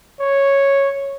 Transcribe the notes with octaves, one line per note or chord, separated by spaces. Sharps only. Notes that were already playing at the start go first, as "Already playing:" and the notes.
C#5